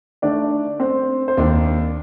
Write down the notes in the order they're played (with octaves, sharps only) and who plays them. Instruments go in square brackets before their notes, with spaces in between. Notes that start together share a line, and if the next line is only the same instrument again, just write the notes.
[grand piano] D3 A3 D#4 [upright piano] D4 D5
[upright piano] C4 C5
C5
[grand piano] D#2 D#3 A#3 D#4 [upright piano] D4 D5